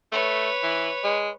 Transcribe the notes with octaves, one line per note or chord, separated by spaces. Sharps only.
A3 B4 C#5
E3
G#3